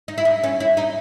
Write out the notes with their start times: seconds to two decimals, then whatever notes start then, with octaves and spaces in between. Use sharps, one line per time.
0.08 D#4
0.18 E4
0.25 D#4
0.44 C#4
0.60 E4
0.77 D#4